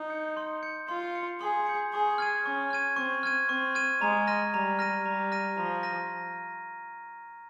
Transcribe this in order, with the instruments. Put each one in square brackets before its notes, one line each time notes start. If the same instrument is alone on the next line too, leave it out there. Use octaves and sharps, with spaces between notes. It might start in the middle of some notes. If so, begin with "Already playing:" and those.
Already playing: [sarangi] D#4
[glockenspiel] G6 C#7
C6
G6 C#7
[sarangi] F4 [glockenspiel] C6
[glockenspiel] G6 C#7
[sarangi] G#4 [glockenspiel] C6
[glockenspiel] G6 C#7
[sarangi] G#4 [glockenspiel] C#6
[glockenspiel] F6 G#6 D#7
[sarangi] C#4 [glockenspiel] C#6
[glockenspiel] F6 G#6 D#7
[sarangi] C4 [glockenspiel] C#6
[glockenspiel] F6 G#6 D#7
[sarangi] C4 [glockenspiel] C#6
[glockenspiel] F6 G#6 D#7
[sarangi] G#3 [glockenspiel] A#5
[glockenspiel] F6 A#6 D#7
[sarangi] G3 [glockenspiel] A#5
[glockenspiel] F6 A#6 D#7
[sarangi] G3 [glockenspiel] A#5
[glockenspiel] F6 A#6 D#7
[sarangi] F3 [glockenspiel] A#5
[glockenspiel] F6 A#6 D#7